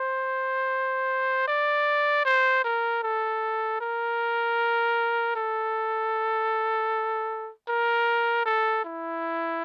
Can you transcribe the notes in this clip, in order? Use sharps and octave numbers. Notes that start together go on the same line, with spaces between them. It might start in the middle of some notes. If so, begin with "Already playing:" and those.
Already playing: C5
D5
C5
A#4
A4
A#4
A4
A#4
A4
E4